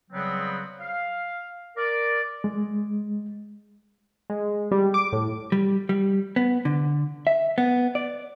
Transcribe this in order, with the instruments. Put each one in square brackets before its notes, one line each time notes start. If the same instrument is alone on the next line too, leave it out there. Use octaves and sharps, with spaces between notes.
[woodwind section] C#3 F#3 G3 B3 C4
F5
A#4 D5
[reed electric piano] G#3
[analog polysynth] G#3
G3
D6
A2
[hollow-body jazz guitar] G3
G3
B3
D3
E5
B3
D5